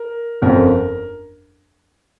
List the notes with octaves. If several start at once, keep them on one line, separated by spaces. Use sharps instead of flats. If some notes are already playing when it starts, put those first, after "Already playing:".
Already playing: A#4
G1 F2 D3 F3 C#4 A#4